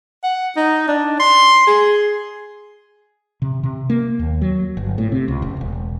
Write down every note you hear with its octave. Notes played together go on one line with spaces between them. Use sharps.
F#5
D#4
D4
C6
G#4
C3
C3
A#3
D#2
F#3
G1
A2
C3
C#2
F1
E1